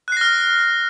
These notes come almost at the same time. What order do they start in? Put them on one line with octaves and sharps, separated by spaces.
F#6 C7 A#6 F6